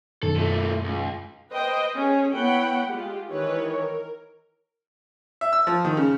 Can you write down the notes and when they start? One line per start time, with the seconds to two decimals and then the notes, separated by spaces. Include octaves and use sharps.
0.23 F#2 B2 D#3 A4
0.36 A#2 A3
0.84 C#2
1.50 B4 C5 D#5 G5
1.96 C#4 G#4
2.35 B3 E4 C#5 F#5 G5 B5
2.88 G#3 F4 G4
3.30 D#3 E3 B4 C#5
3.78 A#4
5.41 E5
5.53 E6
5.67 F3
5.85 D#3
5.97 C#3